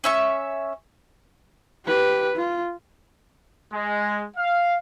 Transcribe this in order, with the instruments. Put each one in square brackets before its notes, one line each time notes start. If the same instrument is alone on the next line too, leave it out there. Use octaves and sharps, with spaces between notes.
[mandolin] C#4 E5 C#6
[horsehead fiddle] G4 B4
F4
[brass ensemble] G#3
F5